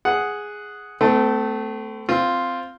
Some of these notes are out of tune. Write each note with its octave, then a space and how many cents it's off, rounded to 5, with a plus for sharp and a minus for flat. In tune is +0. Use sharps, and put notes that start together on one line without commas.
G#4 +0 F#5 +0
A3 +0 C4 -40
C4 +0 F4 +0